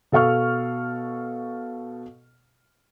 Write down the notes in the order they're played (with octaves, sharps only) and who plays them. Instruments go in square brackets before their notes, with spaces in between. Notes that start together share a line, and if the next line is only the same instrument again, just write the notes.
[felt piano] B2 A4 F5 C#6 F6